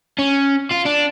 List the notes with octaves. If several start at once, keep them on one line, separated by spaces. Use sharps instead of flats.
C#4
F4
D4